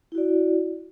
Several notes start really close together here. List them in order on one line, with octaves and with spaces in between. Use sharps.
E4 F#4 D5